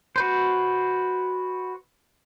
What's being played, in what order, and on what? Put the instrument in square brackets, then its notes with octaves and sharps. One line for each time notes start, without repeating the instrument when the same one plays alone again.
[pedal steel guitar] F#4 B4 C5